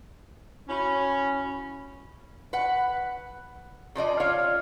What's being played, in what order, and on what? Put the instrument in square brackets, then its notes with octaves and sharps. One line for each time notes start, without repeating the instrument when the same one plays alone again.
[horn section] C#4 [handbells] E4 F#4 B5
[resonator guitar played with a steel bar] B4 F#5
C#3 F3 D5 D#5
F4 C#5 D5 F5